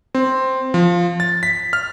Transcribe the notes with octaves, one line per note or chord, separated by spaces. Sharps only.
C4
F3
A6
B6
F6